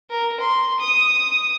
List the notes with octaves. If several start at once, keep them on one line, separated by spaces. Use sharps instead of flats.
A#4
C6
D#6